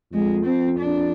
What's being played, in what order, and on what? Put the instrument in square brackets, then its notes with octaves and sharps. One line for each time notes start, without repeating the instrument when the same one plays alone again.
[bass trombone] F2 [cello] G#3
[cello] C4
D4